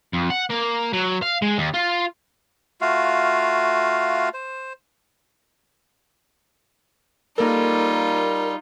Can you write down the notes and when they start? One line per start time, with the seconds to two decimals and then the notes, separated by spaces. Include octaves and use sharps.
0.13 F2
0.30 F#5
0.50 A#3
0.93 F#3
1.22 F5
1.42 G#3
1.58 D#2
1.74 F4
2.81 A3 F4 F#4 F5
4.34 C5
7.38 G3 A#3 D#4 F4 A4 A#4